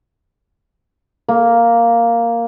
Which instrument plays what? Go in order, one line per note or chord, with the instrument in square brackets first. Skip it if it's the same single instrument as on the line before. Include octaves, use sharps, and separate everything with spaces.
[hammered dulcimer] A#3